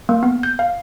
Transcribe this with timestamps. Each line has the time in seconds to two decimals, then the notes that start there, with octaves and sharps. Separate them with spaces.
0.09 A#3
0.23 B3
0.43 G6
0.59 F5